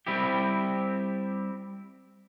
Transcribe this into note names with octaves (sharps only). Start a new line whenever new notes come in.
G3 C4 E4 G4